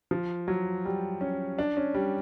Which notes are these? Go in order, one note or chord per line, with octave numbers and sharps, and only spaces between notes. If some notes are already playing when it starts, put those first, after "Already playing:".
F3
F#3
G3
C#4
D4
C#4
G3